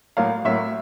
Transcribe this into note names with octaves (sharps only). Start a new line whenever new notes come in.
A2 F#3 A#3 F5
A2 F#3 A#3 E5